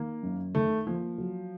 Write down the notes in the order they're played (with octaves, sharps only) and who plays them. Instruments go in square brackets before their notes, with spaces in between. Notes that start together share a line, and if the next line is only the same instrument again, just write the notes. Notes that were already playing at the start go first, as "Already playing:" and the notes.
Already playing: [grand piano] D#3 [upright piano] A#3
[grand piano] F#2
[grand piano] D#3 [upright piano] A3
[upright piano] F3 [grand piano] A#3
[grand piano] F#3